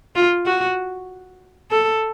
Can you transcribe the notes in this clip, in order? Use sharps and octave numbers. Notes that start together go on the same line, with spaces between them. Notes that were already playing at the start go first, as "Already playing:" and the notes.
F4
F#4
A4